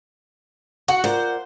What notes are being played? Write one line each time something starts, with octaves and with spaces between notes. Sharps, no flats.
F#4 F#5
F4 A#4 C5 D5